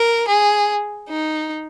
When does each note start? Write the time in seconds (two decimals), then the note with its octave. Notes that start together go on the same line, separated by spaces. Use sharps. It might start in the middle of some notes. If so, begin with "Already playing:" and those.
Already playing: A#4
0.28 G#4
1.09 D#4